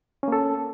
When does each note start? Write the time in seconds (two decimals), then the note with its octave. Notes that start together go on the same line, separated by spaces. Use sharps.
0.23 C#4
0.28 A#3
0.32 A4